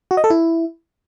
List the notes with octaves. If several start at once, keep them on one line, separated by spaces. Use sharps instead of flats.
F#4
D#5
A4
E4